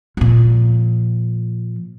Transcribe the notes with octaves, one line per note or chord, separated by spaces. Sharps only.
A#2 F3